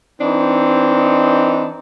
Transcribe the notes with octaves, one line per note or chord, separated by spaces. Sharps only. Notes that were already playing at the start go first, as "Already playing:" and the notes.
E3 C4 D4 D#4